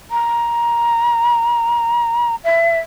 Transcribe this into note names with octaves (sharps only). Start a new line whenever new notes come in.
A#5
E5